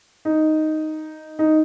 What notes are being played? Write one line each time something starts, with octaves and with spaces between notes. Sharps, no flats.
D#4
D#4